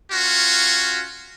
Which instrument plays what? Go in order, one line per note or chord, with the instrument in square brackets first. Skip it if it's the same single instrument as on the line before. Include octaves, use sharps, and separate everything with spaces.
[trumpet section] C#4 F4 F#4